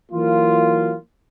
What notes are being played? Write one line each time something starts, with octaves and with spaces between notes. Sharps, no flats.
E3 F#3 A#3 F4